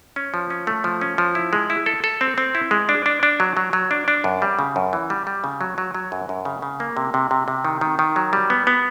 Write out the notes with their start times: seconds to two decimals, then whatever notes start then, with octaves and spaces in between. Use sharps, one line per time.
0.16 C#4
0.34 F3
0.50 C#4
0.67 A3
0.84 F3
1.01 C#4
1.18 F3
1.35 E4
1.53 G#3
1.70 E4
1.86 A4
2.04 A4
2.21 C4
2.38 C4
2.55 E4
2.71 G#3
2.89 D4
3.06 D4
3.23 D4
3.40 F#3
3.57 F#3
3.73 F#3
3.91 D4
4.08 D4
4.24 F#2
4.42 G3
4.59 C#3
4.76 F#2
4.93 E3
5.10 G3
5.27 G3
5.44 C#3
5.61 F#3
5.78 F#3
5.94 F#3
6.12 F#2
6.29 F#2
6.45 C#3
6.62 C#3
6.80 A#3
6.97 C3
7.14 C3
7.31 C3
7.48 C3
7.65 D#3
7.81 D#3
7.99 D#3
8.16 F#3
8.33 G3
8.50 B3
8.67 B3